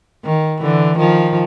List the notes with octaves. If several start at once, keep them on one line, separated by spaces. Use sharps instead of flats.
D#3
D3 E3
D#3 F3